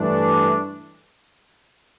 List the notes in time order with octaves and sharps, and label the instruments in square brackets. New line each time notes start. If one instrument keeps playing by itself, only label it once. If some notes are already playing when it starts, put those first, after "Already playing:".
Already playing: [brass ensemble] G2 E3 A3 D4